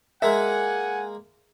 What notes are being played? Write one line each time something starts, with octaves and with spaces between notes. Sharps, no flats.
G#3 A#3 E5 F#5 G#5